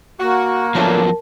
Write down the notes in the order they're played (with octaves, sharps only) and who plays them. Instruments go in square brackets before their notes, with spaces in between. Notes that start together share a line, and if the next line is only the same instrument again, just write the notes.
[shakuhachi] A#3 [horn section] F#4
[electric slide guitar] F3 F#3 B3 [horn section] A3 C#4 D4 [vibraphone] A#4 A5